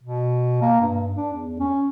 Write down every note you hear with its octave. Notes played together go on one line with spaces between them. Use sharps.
B2
A#3
G2
D4
E2
C#4